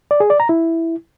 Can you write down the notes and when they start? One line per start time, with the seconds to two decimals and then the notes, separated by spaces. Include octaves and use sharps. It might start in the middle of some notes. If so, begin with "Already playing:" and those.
0.11 D5
0.20 G#4
0.30 D5
0.40 A#5
0.49 E4